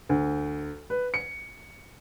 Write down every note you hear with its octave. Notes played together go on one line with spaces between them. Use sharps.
D2
B4
C#7